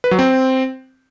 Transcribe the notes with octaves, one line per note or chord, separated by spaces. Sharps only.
B4
F#3
C4